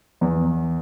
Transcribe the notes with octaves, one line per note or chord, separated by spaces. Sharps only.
E2